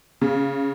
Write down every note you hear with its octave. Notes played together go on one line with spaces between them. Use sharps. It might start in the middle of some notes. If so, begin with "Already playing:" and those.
C#3